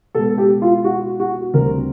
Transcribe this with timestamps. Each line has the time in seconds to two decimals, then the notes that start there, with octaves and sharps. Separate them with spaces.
0.15 B2 G#3 B3 A4
0.38 G4
0.62 F4
0.84 F#4
1.20 F#4
1.53 D2 D3 G3 C4 A#4